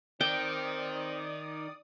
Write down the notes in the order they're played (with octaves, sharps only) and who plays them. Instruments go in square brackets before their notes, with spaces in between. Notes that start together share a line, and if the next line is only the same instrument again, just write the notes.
[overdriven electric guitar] D#3 [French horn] C4 [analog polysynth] D5 D#6 [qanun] G5